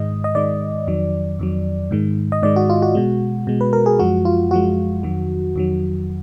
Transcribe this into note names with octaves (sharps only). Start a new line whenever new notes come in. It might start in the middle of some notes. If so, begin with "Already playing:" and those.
Already playing: G#2 D#3 G#3 D#5
D#5
G#2 D#3 G#3 D5
F2 D#3 F#3
F2 D#3 F#3
G#2 D#3 G#3
D#5
G#2 D#3 G#3 D5
F#4
F4
F#4
B2 G#3
B2 G#3
B4
A#4
G#4
F#2 F3 G#3 F#4
F4
F#2 F3 G#3 F#4
F2 D#3 F#3
F2 D#3 F#3